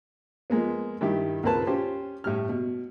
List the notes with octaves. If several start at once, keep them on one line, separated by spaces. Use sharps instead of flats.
F3 G#3 A#3 B3
G2 D#3 E4 G4
C#2 A#2 C4 A#4 B4 A5
C#4 F4 G4 C5
A2 G3 F6
B2